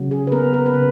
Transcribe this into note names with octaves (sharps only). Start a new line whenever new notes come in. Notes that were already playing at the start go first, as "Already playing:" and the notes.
Already playing: C#3 F#3
G#4
B4
B3 A#4
A#4
B4
C#3